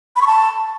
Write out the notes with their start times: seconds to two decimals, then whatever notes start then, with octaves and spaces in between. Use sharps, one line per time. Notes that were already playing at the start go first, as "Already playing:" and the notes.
0.16 B5
0.21 C#6
0.27 A5